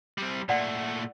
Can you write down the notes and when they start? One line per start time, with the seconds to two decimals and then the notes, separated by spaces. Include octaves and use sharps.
0.18 G3 C4
0.49 A#2 A3 D5 F#5